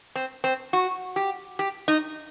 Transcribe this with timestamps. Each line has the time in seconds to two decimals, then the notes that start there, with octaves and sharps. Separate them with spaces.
0.15 C4
0.44 C4
0.73 F#4
1.16 G4
1.59 G4
1.88 D#4